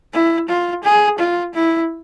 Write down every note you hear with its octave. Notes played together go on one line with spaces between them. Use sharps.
E4
F4
G#4
F4
E4